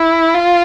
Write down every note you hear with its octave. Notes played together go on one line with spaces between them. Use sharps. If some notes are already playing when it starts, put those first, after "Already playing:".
Already playing: E4
F4